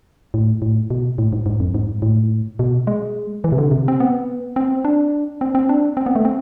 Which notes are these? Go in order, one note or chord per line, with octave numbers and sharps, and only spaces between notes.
A2
A2
B2
A2
G#2
G#2
F2
G#2
A2
B2
G#3
E3
C3
D3
C3
C4
B3
C4
D4
C4
C4
D4
C4
B3
A3
C4